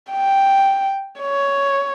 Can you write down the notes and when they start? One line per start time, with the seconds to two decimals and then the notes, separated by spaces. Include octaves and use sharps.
0.12 G5
1.20 C#5